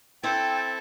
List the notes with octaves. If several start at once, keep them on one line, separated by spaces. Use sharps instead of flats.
C4 E4 A4 G5 A6